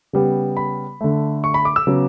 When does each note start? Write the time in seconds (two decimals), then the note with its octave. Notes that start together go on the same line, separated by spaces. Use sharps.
0.13 C#3 G3 B3
0.57 B5
1.01 D3 A3
1.44 C#6
1.54 B5
1.65 D6
1.76 E6
1.87 C#3 F#3 B3